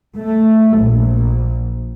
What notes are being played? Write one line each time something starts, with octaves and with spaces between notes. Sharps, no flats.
A3
A#1